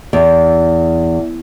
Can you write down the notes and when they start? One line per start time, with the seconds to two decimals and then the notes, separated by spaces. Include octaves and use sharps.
0.13 E2